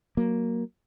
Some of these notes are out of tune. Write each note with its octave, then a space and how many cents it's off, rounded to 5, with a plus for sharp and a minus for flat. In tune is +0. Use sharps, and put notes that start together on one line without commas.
F#3 +0 A#3 +0